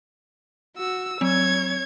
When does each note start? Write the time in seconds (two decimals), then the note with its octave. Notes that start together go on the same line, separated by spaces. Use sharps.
0.77 F#4 E6
1.21 F#3 C4 C#5 G#6